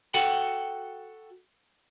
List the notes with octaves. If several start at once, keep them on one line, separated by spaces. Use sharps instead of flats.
F#4 A4 F#5 G5